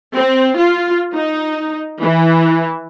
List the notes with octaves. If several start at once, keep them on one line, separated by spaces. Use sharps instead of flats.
C4
F4
D#4
E3